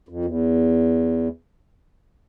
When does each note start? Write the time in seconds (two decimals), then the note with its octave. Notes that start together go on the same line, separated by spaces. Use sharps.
0.09 F2
0.25 E2